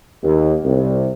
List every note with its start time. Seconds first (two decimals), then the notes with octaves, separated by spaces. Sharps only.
0.23 D#2
0.64 C2